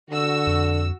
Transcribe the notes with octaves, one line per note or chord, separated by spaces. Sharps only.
D3 F#4 E6
F2